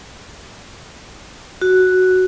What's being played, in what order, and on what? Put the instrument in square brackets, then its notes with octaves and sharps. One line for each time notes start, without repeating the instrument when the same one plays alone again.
[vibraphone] F#4